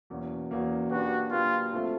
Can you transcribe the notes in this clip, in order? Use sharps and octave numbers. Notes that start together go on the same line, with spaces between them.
E2 B2 F#3 A#3 C#4
E2 B2 F#3 A#3 C#4
F#3 A#3 D4 F#4 G4 B4
F#3 A#3 D4 F4 G4 B4
F3 A3 C4 F4 A4